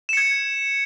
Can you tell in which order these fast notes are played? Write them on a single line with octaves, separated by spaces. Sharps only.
E7 C#7 G#6